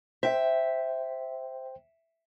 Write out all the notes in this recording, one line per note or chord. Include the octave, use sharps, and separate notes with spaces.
C5 E5 G5